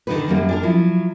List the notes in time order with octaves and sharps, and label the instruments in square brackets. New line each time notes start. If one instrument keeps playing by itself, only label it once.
[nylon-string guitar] D3 D#3 F#3 G#3 D#4 B4
F#2 F#3 G3 A#3
D4 G#4 A#4
F3 F#3 E4